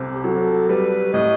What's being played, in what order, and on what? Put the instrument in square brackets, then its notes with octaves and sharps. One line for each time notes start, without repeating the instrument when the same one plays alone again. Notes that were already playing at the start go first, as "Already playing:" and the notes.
Already playing: [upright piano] C2 C3 A3
[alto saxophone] G4
[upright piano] F#3 [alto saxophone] A4
[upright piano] G3 [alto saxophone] B4
[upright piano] A2 [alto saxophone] D#5